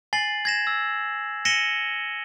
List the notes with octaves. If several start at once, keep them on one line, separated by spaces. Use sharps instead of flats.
G#5 A6 C7 F#7
G#6 A#6 E7
E6
A#6 C#7 D#7 E7 F#7 G7